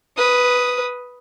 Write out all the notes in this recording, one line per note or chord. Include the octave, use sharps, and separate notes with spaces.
B4 D#6